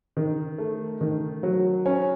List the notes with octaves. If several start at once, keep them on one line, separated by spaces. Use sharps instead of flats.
D#3
A3
D#3
F#3
C#4